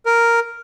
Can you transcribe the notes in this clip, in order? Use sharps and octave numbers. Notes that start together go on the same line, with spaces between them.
A#4